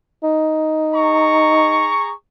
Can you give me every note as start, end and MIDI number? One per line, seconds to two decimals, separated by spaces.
0.23 1.95 63
0.95 2.12 68
0.95 2.12 82
0.95 2.12 85